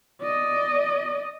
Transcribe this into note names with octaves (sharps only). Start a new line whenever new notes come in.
D5 D#5